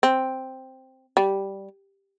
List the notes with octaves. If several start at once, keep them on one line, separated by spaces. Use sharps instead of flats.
C4
G3